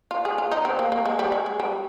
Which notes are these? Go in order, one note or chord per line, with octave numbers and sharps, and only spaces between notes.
F4
G#4
F4
D#4
C4
A#3
A#3
G#3
G3
G#3
G#3
G3